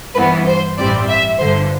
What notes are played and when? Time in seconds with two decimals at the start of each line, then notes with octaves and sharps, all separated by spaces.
0.15 G2 E3 B3 B4
0.47 C5
0.78 A1 G2 E3 G3 C4 D5
1.09 E5
1.40 G1 G2 D3 C5